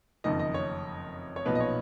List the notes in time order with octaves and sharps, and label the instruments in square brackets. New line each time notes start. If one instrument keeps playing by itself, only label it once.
[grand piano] F#1 F2 D#3 D#5
D#5
C#5
C#5
B1 A#2 F3 B3 D#4 B4
D#5
C#5